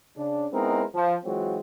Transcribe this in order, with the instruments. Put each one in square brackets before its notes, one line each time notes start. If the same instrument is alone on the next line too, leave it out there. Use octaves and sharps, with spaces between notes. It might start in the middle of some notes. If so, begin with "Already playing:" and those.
[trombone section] C#3 D4
G#3 B3 C4 D#4 E4 A#4
F3
E3 F#3 G#3 C4 F4 F#4